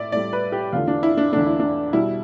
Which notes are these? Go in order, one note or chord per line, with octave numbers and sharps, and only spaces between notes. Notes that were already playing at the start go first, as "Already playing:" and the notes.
Already playing: A2 D5 E5
A2 G3 D5
B4
G4
E2 D3 A3 F4
D4
E4
D4
E2 D3 A3 D4
E4
D4
B2 G3 E4